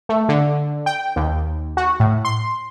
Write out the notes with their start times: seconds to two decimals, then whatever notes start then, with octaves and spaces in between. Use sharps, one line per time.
0.09 A3
0.29 D3
0.86 G5
1.16 D#2
1.77 F#4
2.00 A2
2.25 C6